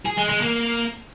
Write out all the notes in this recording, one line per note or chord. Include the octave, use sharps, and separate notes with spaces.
G#4
G#3
G#3
A#3